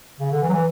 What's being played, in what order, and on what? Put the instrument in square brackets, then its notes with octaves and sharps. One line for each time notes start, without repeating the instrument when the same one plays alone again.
[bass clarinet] C#3
D3
E3
F#3
E3